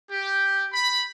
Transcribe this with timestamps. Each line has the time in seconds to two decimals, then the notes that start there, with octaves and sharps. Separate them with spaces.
0.11 G4
0.74 B5